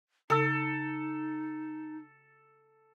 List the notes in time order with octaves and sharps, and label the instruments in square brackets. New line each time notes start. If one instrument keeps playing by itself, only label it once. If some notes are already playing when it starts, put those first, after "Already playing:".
[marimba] C#3 E6 [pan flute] D#4 [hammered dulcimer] A4